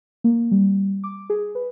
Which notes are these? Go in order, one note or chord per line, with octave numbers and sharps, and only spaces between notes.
A#3
G3
D6
G#4
B4